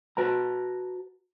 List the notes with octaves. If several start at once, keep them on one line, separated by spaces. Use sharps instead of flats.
F#4 B4 A5 A#5